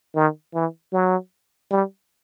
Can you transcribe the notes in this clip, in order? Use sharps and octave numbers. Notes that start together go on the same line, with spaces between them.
D#3
E3
F#3
G3